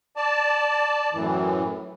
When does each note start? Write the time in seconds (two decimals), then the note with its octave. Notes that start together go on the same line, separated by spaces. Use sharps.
0.17 D5 A5
1.13 F#2 A2 E3